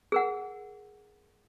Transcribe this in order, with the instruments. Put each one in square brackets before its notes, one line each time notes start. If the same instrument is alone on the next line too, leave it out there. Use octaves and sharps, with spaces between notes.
[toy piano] G#4 A#4 F#5